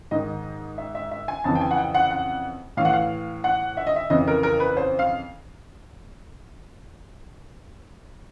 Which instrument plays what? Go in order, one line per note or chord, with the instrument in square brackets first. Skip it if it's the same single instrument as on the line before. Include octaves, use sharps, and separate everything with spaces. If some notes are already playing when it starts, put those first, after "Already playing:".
[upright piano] G#2 D#3 D#5
E5
E5
E5
G#5
F2 C#3 E3 A5
G5
G#5
F#5
G5
F#5
F#5
A2 E3 F5
F#5
F5
F#5
E5
D#5
E5
F2 C#3 E3 D#5
A#4
A#4
B4
C5
F5